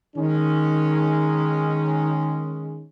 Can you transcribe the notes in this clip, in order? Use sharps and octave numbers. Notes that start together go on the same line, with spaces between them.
D#3 G#3 C#4